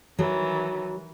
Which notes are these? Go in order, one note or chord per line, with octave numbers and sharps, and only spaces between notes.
D#3 E3 F#3